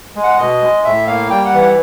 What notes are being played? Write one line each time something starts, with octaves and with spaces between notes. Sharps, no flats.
G#3
F#5
B2 D#5
G#3
A2 E5
A#3 F5
G3 G5
F#5
E3
F#5